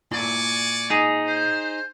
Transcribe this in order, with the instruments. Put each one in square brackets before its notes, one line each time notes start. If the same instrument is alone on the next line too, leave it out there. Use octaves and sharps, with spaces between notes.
[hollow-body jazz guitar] A#2 E4 C6 [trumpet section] D5 G#5 C#6
[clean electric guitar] D#4 G#4
[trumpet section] C5